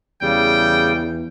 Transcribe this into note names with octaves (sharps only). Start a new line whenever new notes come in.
E2 C#3 G3 G5